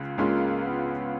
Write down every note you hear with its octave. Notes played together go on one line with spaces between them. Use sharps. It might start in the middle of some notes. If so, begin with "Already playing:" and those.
Already playing: C#2 C#3 F4
C#2 C#3 G#3 A#3 C#4 F4
B3